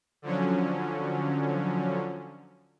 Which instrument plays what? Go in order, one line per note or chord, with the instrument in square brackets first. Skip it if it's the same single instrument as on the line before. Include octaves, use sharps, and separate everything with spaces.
[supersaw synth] D3 F3 F#3 C#4